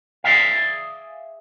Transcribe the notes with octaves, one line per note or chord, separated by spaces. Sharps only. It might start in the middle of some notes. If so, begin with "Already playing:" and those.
G#4 D5 E5 F5